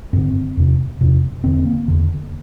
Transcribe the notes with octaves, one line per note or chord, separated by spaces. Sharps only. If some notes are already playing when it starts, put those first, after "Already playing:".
G2 D3 C4
E2 C3
E2 C3
E2 D3 C4
A#3
E2 D3